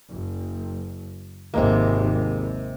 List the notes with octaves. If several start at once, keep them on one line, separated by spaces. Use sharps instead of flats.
F#1
G#1 D#2 C3 G#3 A#3